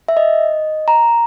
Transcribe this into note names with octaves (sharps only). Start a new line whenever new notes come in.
E5
D#5
A#5